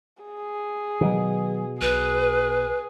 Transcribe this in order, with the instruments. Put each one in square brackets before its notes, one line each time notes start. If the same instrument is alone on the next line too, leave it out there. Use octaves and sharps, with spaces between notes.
[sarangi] G#4
[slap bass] B2 [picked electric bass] D#3 F#3
[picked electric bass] B1 [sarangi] G#4 [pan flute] B4